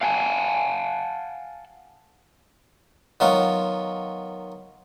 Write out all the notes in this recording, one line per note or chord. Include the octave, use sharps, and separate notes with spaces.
F5 F#5 G#5 A5
D#3 F#3 B3 F4